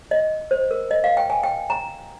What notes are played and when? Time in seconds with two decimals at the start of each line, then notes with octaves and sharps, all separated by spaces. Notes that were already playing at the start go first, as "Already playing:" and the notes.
0.11 D#5
0.51 C5
0.71 A#4
0.91 D#5
1.04 F5
1.17 G5
1.30 G#5
1.43 G5
1.70 A#5